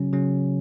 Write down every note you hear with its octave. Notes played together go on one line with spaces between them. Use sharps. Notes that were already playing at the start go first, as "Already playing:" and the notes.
Already playing: C#3 F#3 C#4
C#3 F#3 C#4